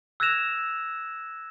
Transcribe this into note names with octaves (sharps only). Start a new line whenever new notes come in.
E6 F#6 G#6 A#6 E7 F7